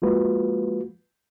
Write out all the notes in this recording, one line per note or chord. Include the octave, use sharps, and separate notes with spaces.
F3 G#3 A#3 F4 F#4 B4